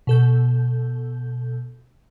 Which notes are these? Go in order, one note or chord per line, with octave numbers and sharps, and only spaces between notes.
B2 A4 G6